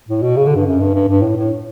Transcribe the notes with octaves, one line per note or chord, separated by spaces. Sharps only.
A2
B2
C#3
D3
G2
F#2
G2
G2
G2
A2
A2